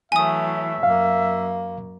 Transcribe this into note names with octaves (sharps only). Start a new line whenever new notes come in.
E3 F#3 A3 E5 G#5 D#6
F#2 A#3 F5